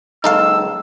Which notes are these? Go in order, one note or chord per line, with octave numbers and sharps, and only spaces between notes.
C#2 F#2 D#4 A4 F5 E6